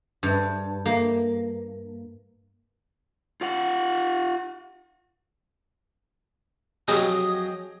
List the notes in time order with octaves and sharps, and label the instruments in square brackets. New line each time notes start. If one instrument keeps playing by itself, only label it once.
[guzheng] G2
A#3
[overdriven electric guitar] F4 F#5
[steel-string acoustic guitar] F2 F#3 [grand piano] G4 G#4 D#5 [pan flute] D#6